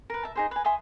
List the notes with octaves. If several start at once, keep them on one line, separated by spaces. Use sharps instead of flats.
A#4 B4
E5 A5
D#4 G#4 C5
B4 G#5
E5 G#5 C6 D#6